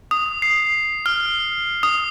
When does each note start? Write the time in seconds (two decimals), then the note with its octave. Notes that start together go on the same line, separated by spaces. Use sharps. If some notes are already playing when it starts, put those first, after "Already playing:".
0.11 D#6
0.42 C7
1.06 F6
1.83 D#6